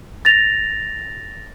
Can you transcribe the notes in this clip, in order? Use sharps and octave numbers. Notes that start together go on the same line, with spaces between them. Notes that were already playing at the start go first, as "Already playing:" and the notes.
A6 A#6 F7